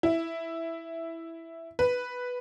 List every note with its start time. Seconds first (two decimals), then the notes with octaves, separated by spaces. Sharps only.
0.03 E4
1.79 B4